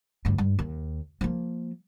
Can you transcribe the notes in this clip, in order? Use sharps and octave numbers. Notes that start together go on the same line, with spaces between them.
D2 G2
G2
D#2
F3 A#3